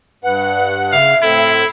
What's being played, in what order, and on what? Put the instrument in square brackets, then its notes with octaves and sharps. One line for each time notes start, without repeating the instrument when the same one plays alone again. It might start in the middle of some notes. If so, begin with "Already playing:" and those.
[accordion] G2 F#5 [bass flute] B4
[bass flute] C#3 [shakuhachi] E5 [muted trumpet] F5
[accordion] A2 C4 [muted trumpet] E4 [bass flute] A4